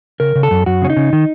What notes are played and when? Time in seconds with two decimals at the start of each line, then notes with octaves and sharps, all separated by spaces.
0.20 C#3 A#4
0.36 C#3
0.43 A4
0.51 F#2
0.66 F#2 F#4
0.82 C#3 C#4
0.90 D#4
0.97 C#3
1.13 D#3